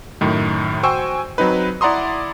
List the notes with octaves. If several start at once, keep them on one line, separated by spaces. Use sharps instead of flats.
F#2 A2 D#3
F#4 C5 G5 G#5 C#6 E6
F#3 C4 D#4 B4
E4 D5 F#5 A#5 C6 D#6